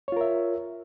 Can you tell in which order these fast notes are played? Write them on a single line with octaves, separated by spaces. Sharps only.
C#5 F4 A#4 E5